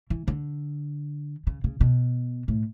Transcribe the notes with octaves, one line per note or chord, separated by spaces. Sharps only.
E3
D3
C#3
C#3
B2
A2